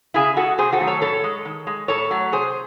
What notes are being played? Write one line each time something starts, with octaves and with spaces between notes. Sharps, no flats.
C#3 E4 G#4
G#3 F#4 A4
C3 G#4 C5
F#4 A4
D#3 F#3 A3
A4 C#5
A2 A4 C#5
G#3
D#3
G#3
A2 A4 C#5
F#3 A3
C3 G#4 C5